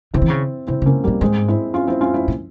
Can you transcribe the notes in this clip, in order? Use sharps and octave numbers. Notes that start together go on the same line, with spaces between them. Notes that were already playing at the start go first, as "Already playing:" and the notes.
C#3 C4 E4
E3
C#3
C3 C4 E4
C#3
A#3 C#4
A#2 G3 A#3
G#2 G#3 C4
C4 E4
C#4 F4
C4 E4
C#4 F4
C4 E4
A#2